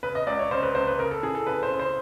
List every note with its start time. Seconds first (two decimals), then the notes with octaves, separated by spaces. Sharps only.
0.03 C#3 B4
0.15 D#5
0.27 C#2 D5
0.39 C#5
0.51 C#3 C5
0.63 B4
0.75 C#2 C5
0.87 B4
0.99 C#3 A#4
1.11 A4
1.23 E3 G#4
1.35 A4
1.47 C#3 B4
1.63 C5
1.71 C#3
1.79 C5